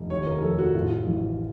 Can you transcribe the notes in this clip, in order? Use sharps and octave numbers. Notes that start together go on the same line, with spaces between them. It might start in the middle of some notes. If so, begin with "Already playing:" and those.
Already playing: F1
D#2 C#5
A#4
F1 A4
F#4
A2 F4
A1